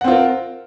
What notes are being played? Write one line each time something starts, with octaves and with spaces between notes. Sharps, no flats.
C4 F4 A#4 F#5